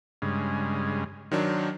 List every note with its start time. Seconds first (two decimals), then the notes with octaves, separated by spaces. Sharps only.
0.22 G2 C#3 G#3
1.31 D#3 F#3 D4 C5